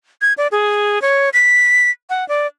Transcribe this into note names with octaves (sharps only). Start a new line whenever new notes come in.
G#6
D5
G#4
C#5
B6
F#5
D5